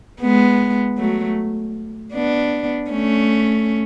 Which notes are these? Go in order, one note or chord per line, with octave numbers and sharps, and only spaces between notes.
G#3 B3
F#3 A3
B3 D4
A3 C#4